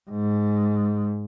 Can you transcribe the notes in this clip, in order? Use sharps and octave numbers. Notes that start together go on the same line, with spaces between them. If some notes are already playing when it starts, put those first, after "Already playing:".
G#2